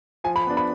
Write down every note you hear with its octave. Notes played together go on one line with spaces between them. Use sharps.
F3 G#5
B5
B3 D4
B5